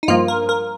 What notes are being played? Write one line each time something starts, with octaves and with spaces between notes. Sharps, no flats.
D#4
G2 F3 A#3 F4
A#4
A#4